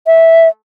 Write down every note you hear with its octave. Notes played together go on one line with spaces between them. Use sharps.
E5